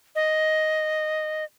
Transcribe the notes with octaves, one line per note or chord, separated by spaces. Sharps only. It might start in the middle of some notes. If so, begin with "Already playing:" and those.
D#5